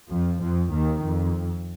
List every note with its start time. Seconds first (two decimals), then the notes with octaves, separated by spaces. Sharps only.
0.10 F2 F3
0.42 F2 F3
0.73 D#2 D#3
1.04 F2